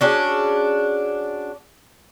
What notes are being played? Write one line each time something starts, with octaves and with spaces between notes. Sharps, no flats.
C#4 D4 F#4 G#4